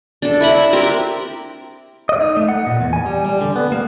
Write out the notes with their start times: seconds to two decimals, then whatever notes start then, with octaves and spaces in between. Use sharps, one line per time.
0.22 D4 A4
0.41 E4 E5 F#5
0.73 C4 G4 A#4
2.09 D#5
2.21 D#4
2.37 A3
2.49 F#5
2.67 A#2
2.81 E2
2.93 G#5
3.06 G3
3.26 G3
3.41 D3
3.56 B3
3.72 A#3